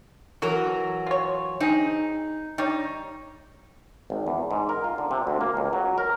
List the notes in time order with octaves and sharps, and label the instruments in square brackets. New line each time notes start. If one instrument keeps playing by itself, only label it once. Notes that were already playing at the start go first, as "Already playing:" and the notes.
[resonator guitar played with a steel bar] E3 F#3 A#4 [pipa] F#4
[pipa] F4 C#5
[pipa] C4 G#4 [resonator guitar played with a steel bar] D#4
[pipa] G3 C#5 [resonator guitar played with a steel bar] D#4
[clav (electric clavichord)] G#1
E2
G#2
A#4
F4
D3
C3
D2
A#3
C#2
F#3
A#4